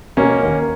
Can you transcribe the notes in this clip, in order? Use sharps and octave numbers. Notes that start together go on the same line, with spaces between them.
B2 A#3 C#4
D#2